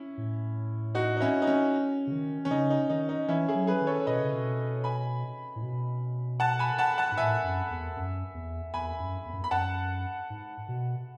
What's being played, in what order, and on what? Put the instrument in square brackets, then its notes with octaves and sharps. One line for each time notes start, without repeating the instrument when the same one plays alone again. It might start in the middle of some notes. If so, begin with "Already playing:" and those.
Already playing: [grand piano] C#4 E4
[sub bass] A2
[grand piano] D#4 F#4
D#4
C#4 E4
D#4
C#4
[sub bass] C#3
D#3
[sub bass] D#3 [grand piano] C#4
[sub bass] C#3 [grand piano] D#4
[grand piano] D#4
[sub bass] D#3 [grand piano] D#4
[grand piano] D#4
[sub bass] E3 [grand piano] C#4 E4
[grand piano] E4 G#4
[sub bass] F#3
[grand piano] G#4 B4
[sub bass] D#3
[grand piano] A4 C#5
[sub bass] B2 [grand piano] B4 D#5
[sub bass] C#3
B2
[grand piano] G#5 B5
[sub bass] A2
B2
[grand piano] F#5 A5
G#5 B5
F#5 A5
F#5 A5
[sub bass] G#2
[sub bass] A2 [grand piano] E5 G#5
[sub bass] F#2
E2
F#2
E2
[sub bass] E2 [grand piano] G#5 B5
[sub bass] F#2
E2
F#2
[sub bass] E2 [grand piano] B5
[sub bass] F#2 [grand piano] F#5 A5
[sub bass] G#2
B2